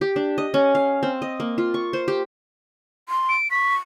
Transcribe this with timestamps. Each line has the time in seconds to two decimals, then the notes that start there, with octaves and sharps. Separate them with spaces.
0.01 G4
0.16 D4
0.38 D#5
0.54 C#4
0.75 F5
1.03 C4
1.22 D#5
1.40 A#3
1.58 F4
1.74 C#6
1.93 C5
2.08 G4
3.09 C6
3.29 D7
3.51 C#6 B6